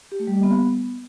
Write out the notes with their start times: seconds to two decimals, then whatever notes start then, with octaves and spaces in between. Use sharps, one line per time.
0.12 G4
0.20 A3
0.27 G3
0.35 A#3
0.43 B3